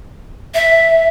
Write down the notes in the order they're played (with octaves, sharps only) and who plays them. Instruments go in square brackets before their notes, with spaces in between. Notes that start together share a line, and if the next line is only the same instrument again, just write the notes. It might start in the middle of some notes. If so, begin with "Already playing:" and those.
[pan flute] E5